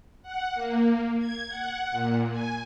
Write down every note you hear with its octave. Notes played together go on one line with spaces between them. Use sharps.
F#5
A#3
G#6
F#5
A#2
G#5